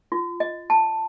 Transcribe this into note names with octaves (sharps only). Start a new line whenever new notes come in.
F4
D#5
A5